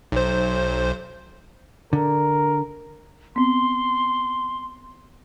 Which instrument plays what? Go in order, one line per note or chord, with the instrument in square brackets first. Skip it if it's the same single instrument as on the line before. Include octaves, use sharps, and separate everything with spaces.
[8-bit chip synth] B1 C5
[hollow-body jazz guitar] D3 [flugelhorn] A#4
[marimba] B3 C4 [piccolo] C6